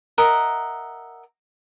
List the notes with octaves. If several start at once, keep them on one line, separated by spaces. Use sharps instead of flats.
A#4 D#5 E5 F#5